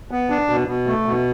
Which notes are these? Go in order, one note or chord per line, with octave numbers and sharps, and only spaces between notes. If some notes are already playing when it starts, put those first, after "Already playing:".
B3
D4
B2
B2
A3
B2